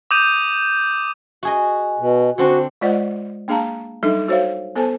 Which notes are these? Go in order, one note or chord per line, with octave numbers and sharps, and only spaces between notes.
D6 D#6 G6 D#7 F7
F#4 G#4 D#5
B2
D3 C4 D4 F#4
G#3 F4 C5 D5 D#5 F#5
A#3 D4 G#4 F5 A5 A#5
F#3 G3 D4 D#4 A4
F#4 C5 C#5 E5 F5
B3 A4 C5 G#5 A5